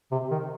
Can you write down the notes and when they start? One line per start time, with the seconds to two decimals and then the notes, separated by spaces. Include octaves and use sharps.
0.12 C3
0.31 D#3